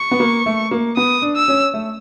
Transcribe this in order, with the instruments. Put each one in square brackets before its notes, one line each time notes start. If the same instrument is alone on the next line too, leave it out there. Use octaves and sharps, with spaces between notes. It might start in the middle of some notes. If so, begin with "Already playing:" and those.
Already playing: [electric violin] C#6
[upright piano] B3
A#3
A3
A#3
[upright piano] B3 [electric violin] D#6
[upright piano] D4
[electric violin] E6
[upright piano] C#4
A3